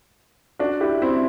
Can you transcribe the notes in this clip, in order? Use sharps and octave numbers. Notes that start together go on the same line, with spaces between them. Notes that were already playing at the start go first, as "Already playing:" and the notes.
D4 F#4
E4 G4
C4 E4